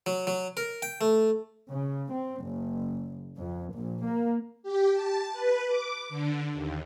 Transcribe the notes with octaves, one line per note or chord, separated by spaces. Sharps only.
F#3
F#3
A#4
G5
A3
C#3
C4
F#1
F2
A#1
A#3
G4
A5
B4
D6
D3
D#2